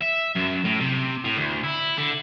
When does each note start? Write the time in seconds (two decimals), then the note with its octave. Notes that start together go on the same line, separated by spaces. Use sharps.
0.02 E5
0.36 F#2
0.65 A2
0.81 C3
1.24 A2
1.37 D2
1.64 E4
1.97 D3